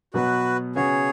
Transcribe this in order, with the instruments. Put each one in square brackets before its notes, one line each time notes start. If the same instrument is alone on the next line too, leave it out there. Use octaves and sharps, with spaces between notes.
[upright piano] B2 F#3 B3 [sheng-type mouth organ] F#4 B4
[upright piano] C#3 B3 F#4 [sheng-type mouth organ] G#4 C#5